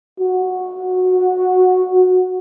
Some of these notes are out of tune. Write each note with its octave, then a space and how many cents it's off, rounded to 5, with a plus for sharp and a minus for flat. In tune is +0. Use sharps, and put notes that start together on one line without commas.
F#4 -10